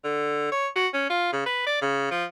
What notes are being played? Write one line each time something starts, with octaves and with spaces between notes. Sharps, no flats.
D3
C#5
F#4
C#4
F4
C#3
B4
D5
C#3
F3